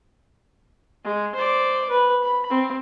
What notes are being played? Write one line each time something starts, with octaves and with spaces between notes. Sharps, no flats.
G#3
C5 D5
B4
B5
C4